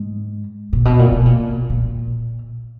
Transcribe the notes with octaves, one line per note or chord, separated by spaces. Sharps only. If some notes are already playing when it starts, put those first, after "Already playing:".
Already playing: G#2
A#2
B2
A#2
B2
A#2
A#2